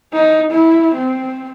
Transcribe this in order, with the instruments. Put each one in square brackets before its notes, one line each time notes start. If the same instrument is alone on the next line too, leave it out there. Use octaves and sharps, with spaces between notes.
[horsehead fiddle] D#4
E4
C4